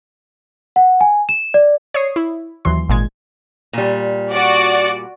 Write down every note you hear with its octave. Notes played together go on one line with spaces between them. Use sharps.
F#5
G#5
E7
D5
C#5 D5 D#6 C7
E4
D#2 E3 F#3 C6
G#1 A#2 G#3 G#6
A#2 G3
F#4 D5